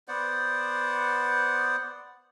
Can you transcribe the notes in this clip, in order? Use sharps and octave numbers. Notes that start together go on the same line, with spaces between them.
B3 C5 D5 F#5